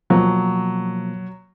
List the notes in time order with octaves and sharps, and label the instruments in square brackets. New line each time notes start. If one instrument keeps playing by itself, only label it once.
[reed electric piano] B2 F3 A#3 [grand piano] F#3